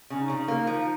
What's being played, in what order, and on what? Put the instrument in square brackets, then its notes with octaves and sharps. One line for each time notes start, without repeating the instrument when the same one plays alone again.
[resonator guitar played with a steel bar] C#3 [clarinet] C#4
[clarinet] D#4
[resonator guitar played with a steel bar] C#3
A#3
F3